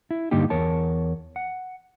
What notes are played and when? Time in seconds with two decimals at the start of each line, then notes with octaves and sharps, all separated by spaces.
0.11 E4
0.31 G2 D3 A#3 D#4 G4
0.50 E2 A#4 C#5 A5
1.36 F#5